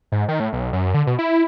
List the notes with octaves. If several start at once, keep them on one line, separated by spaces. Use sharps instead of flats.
G#2
D#3
A2
B1
F#2
D3
B2
E4